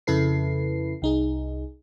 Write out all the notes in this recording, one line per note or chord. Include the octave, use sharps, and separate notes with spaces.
F2 C#3 E4 A4 B4 C7
C2 D#4 G#4